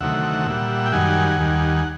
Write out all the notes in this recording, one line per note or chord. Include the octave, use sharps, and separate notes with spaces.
D2 C3 D#3 F#3 A3 E5 F#5
A#2 G3
G5
F#2 D#3 G3 F#5 G#5
D#2 D#3 G3
G#5